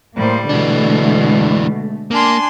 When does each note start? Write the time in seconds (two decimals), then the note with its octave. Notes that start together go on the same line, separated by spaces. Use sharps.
0.16 A2 G3 A#3 C5
0.49 B2 D3 E3 G#3 A3 D4
2.11 A#3 D4 G#5 C6